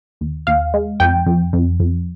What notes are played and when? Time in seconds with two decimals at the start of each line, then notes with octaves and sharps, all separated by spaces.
0.21 D#2
0.47 D#2 F5
0.74 G#3
1.00 F2 G5
1.26 F2
1.53 F2
1.80 F2